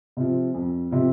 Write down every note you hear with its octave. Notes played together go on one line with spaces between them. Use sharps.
C3 F3
F2
C3 F3